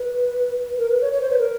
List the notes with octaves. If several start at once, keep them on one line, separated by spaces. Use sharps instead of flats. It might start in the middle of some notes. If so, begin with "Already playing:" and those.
Already playing: B4
A#4
B4
C#5
C#5
C5
B4
A#4